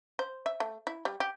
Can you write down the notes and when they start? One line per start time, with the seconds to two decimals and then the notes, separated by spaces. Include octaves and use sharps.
0.19 C5
0.46 E5
0.60 A3
0.87 E4
1.05 G3
1.20 G4